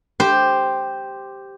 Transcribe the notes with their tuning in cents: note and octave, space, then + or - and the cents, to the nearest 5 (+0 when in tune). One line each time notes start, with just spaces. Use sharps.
G4 +0 C5 +0